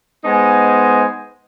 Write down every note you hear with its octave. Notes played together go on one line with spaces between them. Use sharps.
G#3 B3 D#4 C5 G#5